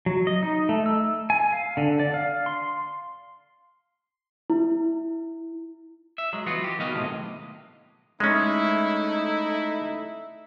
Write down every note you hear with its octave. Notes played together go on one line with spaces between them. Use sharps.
F#3
D#5
D#4
A3
E6
G#5
F5
D3
D5
F5
C6
E4
E5
F#3 G#3
E3 F#3 B3 F4 F#4
G4
D#3 B3 F#4 D#5 F5
B1 A2 C3 G#3
G#3 A3 C#4 D#4 E4